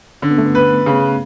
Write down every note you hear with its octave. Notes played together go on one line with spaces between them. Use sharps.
D3 C#4
B3
A3
B3
B4
C#3